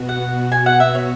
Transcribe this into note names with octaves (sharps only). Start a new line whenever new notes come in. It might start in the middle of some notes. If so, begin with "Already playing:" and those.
Already playing: B2 B3 F#4
F#5
G#5
F#5
E5
C#5